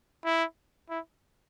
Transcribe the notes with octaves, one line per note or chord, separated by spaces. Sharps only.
E4
E4